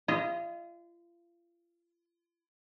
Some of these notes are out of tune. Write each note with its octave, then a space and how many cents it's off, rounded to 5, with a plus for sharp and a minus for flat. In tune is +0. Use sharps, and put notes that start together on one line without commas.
F4 -35 D#5 +0